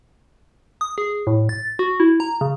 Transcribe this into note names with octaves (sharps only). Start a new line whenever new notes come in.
D#6
G#4
A2
A6
F#4
E4
A#5
C#3